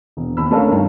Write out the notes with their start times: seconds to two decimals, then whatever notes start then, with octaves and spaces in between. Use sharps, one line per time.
0.17 E1
0.37 D#2 B5 E6
0.51 A3 C#4 D4 A4 A#4 F5
0.71 G2 D#3